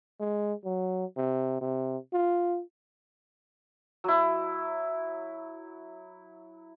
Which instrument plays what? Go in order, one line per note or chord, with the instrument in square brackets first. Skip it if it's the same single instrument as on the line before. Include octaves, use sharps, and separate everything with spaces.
[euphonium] G#3
F#3
C3
C3
F4
[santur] F#3 E4